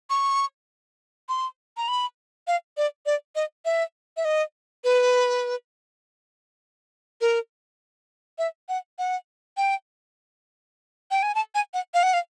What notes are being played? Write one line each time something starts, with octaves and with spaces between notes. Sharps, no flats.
C#6
C6
A#5
B5
F5
D5
D5
D#5
E5
E5
D#5
B4
A#4
E5
F#5
F#5
G5
G5
G#5
A5
G#5
F#5
F5
F#5
F5